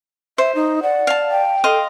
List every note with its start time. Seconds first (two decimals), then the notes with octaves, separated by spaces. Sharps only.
0.38 C5 E5
0.55 D#4
0.83 D5 F#5
1.07 F5 A5
1.31 G5
1.64 A4 D#5 F5 C6